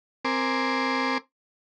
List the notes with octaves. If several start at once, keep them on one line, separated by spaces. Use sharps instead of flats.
C4 A#4 G#5 C6 D6